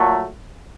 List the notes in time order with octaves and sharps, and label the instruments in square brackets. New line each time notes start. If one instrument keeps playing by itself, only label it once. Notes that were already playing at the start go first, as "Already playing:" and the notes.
Already playing: [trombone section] A#2 F#3 A3